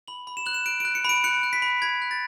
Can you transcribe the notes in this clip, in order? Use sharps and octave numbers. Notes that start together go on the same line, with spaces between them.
B5 F#7
B5
E7
F#6 F#7
E7
F#6 D7
D7
F#6
C#7
B5 D7
F#6 C#7
F#6
B6
B5
B5 G#6
F#6
A6